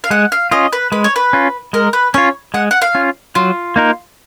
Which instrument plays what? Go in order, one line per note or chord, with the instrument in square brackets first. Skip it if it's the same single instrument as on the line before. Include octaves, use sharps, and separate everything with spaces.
[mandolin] F5
[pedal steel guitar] G#3 [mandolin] F#5
[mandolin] F5
[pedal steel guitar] C#4 F4 [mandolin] D#5
[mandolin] B4
[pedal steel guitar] G#3 [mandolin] B4
[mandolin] C#5
B4
[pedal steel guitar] C#4 F4
[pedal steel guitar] G#3 [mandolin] A#4
[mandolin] B4
[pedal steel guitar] C#4 F4 [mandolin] C#5
[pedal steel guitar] G#3 [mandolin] F#5
[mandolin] F#5
F5
[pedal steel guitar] C#4 F4
[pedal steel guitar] F#3 [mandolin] F4
[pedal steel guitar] A#3 D#4 A#4